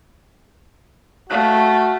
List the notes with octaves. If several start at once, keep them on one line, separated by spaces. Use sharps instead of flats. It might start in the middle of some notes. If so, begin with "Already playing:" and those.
A3 F#4 F5 F#6